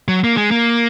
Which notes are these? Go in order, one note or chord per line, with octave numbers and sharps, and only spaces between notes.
F#3
A#3
G#3
A#3